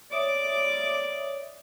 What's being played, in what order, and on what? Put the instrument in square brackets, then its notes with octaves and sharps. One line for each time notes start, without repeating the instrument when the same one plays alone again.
[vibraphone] C#5 E5 D#6 [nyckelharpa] D5 D6